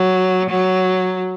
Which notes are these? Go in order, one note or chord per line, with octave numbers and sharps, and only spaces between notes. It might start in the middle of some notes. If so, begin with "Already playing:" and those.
Already playing: F#3
F#3